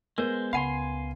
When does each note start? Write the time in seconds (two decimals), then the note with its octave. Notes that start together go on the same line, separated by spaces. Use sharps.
0.18 G#3 B3 A#4 C5
0.53 C#2 F5 F#5 G#5 B5 C6